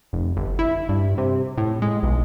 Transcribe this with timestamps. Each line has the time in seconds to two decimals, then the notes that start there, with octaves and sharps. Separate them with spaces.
0.13 F1
0.37 G1
0.59 E4
0.89 G2
1.18 C3
1.57 A2
1.82 G#3
2.03 B1